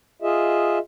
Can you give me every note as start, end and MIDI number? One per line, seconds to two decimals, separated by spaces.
0.22 0.79 65
0.22 0.79 68
0.22 0.79 75
0.22 0.79 76